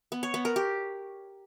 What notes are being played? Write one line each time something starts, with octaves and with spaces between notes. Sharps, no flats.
B3
C#5
B3
A#4
G4